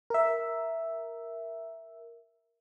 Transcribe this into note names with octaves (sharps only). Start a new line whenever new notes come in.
A#4 E5